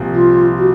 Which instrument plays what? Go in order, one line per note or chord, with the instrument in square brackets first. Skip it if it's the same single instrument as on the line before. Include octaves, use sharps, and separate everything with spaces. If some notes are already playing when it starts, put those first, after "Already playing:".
Already playing: [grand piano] C2 A#2 F3
[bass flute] F4
F#4